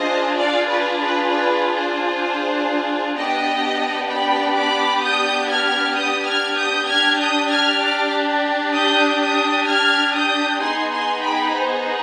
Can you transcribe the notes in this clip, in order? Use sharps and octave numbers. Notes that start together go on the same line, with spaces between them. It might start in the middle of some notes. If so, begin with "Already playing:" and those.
Already playing: D4 F4 G#4 C5 D#5
D5 F5
B4 D5
B4
B4
C5
B3 D4 G4 D#5 G5
G5 B5
B5 D6
D#6 G6
F6 G#6
D#6 G6
F6 G#6
D#6 G6
D4 G4 F6 G#6
D#6 G6
F6 G#6
D6 F6
D#6 G6
D#6 G6
F6 G#6
D#6 G6
B3 D#4 G#4 G#5 C6
G#5 C6
G5 B5
C5